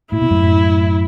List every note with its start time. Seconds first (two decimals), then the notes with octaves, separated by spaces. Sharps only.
0.12 A2 E4
0.21 B2
0.31 F#2 A2